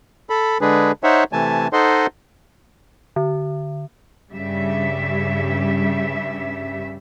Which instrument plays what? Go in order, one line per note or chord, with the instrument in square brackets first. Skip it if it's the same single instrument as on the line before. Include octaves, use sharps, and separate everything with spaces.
[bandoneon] A4 B5
D3 G#3 D4 G#4 B4
D#4 C5 C#5 E5 F#5
C3 E3 A3 G#5 A5
D#4 A4 C5 D#5 F#5 C6
[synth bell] D3
[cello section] G2 C#3 G3 E5